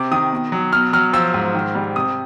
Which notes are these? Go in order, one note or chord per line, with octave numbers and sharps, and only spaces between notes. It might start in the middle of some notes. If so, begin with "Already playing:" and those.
Already playing: C3 D6
D#3 D#6
B2
F#3
B2 F6
F#3 F6
F3 E6
G#2
D#3
G3
C3 D#6